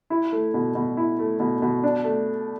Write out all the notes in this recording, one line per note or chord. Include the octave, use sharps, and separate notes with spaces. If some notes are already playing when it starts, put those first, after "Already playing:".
E4
A3
B2
B2
E4
A3
B2
B2
D4
A3